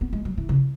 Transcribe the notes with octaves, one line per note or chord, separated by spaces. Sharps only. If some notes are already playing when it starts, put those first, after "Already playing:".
B3
G#3
F#3
E3
C#3